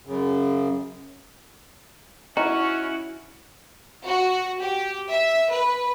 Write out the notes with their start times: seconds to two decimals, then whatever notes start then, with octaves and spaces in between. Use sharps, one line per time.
0.07 F#2 C#3
2.37 C#4 D#4 E4 F#4
4.06 F#4
4.60 G4
5.11 E5
5.51 B4